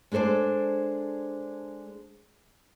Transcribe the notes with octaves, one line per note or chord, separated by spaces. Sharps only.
G#3 D4 A4 C5 D5